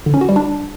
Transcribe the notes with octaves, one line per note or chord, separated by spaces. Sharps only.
D3
C#4
F#4
G3
D4